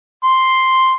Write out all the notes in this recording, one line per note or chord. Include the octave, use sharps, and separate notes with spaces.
C6